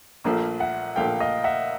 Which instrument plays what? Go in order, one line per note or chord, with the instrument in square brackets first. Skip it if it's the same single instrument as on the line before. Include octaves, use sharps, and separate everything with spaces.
[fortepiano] A#1 A#2 F3 A3
[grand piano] E5 F#5
[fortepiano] A#1 A#2 F3 A3 [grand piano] F5 G5
[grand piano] D#5 F5
E5 F#5